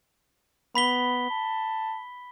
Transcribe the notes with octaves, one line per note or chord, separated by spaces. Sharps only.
B3 B5 B6 G7
A5